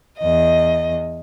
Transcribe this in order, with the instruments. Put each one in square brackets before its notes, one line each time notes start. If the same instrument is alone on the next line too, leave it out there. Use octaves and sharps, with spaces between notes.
[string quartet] E2 D#5